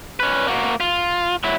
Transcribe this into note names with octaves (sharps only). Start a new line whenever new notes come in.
C#4 B4
A#3 F#4
F4
F#3 E4